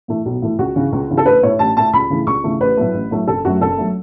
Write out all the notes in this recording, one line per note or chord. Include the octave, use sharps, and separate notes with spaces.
A2 E3 A3
B1
A2 E3 A3
C#2 F#4
C#3 E3
C#2
C#3 E3
A4
A1 B4
A2 A3 C#5
A1 A5
A2 A3 A5
C#2 B5
C#3 E3 A3
C#2 C#6
C#3 E3 A3
A1 B4
A2 F#3 A3
A1
A2 F#3 A3
F#1 A4
F#2 F#3 A3 F#4
F#1 A4
F#3 A3